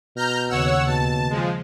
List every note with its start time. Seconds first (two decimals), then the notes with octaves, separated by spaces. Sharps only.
0.16 B2 A#5 F6 G6
0.49 D#2 C#3 C#5 F#5 E6
0.87 B2 A5
1.30 F3 G#3